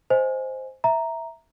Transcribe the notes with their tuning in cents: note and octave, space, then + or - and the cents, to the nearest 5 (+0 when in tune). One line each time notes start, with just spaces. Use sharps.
C5 +0 D#5 +20 G#5 +0
E5 -5 A#5 +0